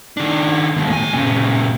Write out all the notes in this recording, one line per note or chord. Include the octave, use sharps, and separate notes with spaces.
D#3 D4
D#2 B2
A2 G#5
A#2 C#3